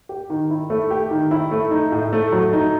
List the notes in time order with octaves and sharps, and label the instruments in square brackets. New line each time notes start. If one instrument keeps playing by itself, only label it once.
[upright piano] G4
D#3
E4
A3
G4
D#3
E4
A3
D#4
A2
A3
F#3
D#4